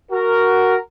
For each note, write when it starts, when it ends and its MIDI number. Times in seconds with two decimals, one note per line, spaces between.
0.12 0.76 66
0.12 0.76 70